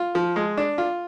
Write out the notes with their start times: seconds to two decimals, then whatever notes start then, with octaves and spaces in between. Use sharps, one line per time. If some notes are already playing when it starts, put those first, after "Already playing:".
Already playing: F4
0.15 F3
0.36 G#3
0.57 D4
0.78 F4